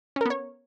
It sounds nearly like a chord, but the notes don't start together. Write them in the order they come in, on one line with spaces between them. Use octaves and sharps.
C#4 A#4 B3 C#5